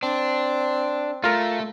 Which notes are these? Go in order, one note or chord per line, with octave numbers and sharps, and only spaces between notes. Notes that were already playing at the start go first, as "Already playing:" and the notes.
C4 D4
A3 F4 A#4